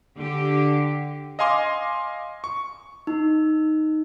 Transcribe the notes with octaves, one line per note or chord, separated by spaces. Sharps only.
D3 G4
D#5 F5 G#5 C6 D6
C#6
D#4